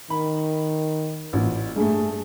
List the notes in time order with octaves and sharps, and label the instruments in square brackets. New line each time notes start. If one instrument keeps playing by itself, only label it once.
[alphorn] D#3 [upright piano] B5
[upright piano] A1 A#2
[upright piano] G2 A3 [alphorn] G#4